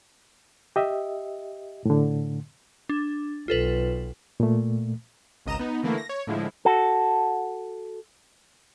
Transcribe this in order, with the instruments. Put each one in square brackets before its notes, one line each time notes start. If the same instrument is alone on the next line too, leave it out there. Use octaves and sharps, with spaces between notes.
[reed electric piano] G4 D#5 E5
A2 D3
[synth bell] D4
[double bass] B1 [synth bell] F4 A4 B4
[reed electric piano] A#2 A3
[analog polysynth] G#1 C#2 D#5 A#5 E7
B3 D#4
D3 E3 A3 A#3 E4
A#6
C#5
A2 D3 F3 G#3 E4
[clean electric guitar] F#4 A4